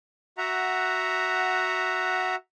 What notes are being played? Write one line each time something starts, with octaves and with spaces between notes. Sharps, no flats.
F#4 E5 F#5 A#5